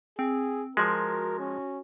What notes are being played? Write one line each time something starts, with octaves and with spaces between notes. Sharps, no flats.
C4 G#4
F3 G#3 F#4 A#4
C#4